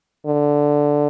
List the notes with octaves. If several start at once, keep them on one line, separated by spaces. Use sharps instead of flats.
D3